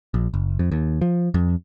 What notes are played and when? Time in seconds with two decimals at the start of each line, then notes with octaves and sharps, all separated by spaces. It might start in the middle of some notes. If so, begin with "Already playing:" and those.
0.14 A#1
0.34 F#1
0.59 F2
0.72 D#2
1.01 F3
1.34 F2